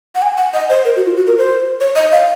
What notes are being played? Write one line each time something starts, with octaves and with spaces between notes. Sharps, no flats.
F#5
G#5
F#5
D#5
C5
A#4
F#4
F4
F#4
A#4
C5
C#5
D#5
F5